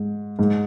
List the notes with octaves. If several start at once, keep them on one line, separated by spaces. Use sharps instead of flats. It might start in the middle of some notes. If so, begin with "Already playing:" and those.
Already playing: G#2
G#2